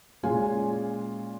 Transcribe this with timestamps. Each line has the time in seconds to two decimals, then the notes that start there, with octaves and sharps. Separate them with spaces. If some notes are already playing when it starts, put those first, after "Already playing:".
0.23 A#2 G#3 C#4 F4 G#5